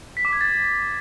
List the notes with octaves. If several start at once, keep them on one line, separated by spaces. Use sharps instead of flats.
B6
D6
G#6
A6